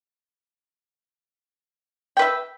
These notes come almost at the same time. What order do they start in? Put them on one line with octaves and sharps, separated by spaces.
G5 B4 E5